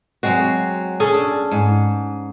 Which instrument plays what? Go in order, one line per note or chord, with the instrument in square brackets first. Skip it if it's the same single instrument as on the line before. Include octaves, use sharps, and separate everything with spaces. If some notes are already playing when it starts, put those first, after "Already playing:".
[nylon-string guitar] F#3 G#3 C4 [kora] F#4
[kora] C#4 G#4 A4
[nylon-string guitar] D4
G#2